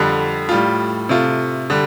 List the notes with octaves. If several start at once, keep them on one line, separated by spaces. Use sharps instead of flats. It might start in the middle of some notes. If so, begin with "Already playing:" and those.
Already playing: F2 D3 G3
A2 G3 F4
C3 A3 F4
D3 G3